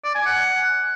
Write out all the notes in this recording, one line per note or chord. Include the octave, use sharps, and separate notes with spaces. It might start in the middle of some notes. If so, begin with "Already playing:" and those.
D5
G#5
F#5